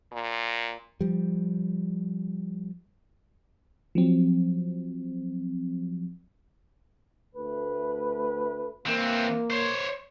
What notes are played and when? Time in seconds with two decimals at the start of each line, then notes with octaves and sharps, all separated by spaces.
0.12 A#2
1.01 F3 G3
3.95 F3 F#3 C4
7.35 D2 A3 B4
8.86 E3 A#3 C4
9.50 C5 C#5